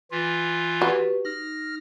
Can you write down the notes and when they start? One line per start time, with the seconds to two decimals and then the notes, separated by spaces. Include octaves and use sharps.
0.11 E3 F4
0.82 F#4 G4 B4
1.25 D#4 F6 A#6